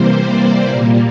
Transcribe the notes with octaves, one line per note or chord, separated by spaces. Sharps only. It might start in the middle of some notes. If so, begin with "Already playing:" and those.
Already playing: C3 E3 G3 A#3 C5
D5
A#2 G3 A#3